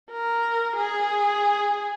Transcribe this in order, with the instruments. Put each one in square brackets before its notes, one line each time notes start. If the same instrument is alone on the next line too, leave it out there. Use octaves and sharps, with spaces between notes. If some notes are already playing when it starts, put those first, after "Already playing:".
[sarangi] A#4
G#4